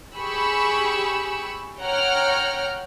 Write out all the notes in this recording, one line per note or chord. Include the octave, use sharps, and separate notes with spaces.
G4 G#4 B5 C#6 E6
C#5 F#5 G5 A#5 F6